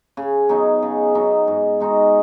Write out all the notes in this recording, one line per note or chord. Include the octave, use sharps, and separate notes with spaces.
C#3
F#3 B3 D#4
C#3
F#3 B3 D#4
G#2
G#3 D#4 F#4